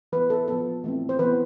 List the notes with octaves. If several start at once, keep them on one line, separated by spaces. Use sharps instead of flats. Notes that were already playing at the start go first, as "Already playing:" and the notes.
E3 B3 B4
A4
F3 B3 A4
E3 A3 C4
C5
E3 B3 B4